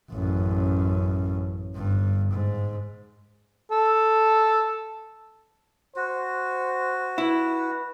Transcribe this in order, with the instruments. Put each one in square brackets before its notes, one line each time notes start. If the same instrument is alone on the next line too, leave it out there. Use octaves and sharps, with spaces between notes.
[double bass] A1 F#2
G1 G2
G#2
[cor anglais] A4
[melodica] F#4 [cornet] C5
[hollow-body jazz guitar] E4 [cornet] B4